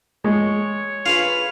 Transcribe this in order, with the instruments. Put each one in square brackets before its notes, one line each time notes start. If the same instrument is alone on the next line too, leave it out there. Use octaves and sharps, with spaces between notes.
[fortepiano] G#3 [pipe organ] C#5
[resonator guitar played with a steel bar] F4 G#4 B4 [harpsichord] F5